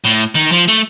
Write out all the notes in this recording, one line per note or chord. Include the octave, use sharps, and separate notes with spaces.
A2
D#3
F3
A3